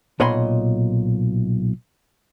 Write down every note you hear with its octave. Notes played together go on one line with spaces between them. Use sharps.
B1 A#2 C#5 D#5 B5 C6